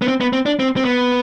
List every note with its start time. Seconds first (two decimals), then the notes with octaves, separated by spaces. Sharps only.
0.02 B3
0.08 C4
0.21 B3
0.33 C4
0.46 D4
0.60 C4
0.77 C4
0.85 B3